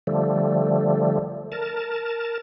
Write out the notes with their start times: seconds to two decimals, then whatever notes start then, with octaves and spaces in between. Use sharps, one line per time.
0.07 D3 F3 G3 A3
1.52 A#4 A5